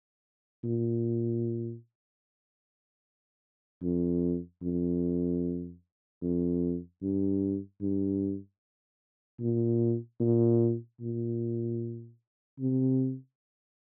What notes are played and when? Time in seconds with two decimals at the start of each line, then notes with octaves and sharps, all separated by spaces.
0.64 A#2
3.82 F2
4.62 F2
6.22 F2
7.02 G2
7.81 G2
9.40 A#2
10.20 A#2
11.00 A#2
12.59 C3